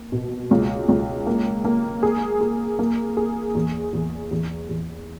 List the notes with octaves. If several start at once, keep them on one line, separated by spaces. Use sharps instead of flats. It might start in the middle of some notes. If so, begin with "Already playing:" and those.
Already playing: A#3
B2
C#2
C#2
A#3
A#3
G#4
G#4
A#3
G#4
E2
E2
E2
E2